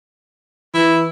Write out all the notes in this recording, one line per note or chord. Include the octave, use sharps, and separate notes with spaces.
E3 E4